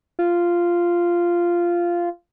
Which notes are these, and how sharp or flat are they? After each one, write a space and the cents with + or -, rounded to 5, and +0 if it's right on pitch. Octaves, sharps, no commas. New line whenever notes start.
F4 -10